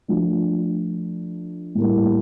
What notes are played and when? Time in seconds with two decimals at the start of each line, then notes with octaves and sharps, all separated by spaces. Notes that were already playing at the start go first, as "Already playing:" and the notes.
0.08 F3 A3 D4
1.75 A2 G3 A#3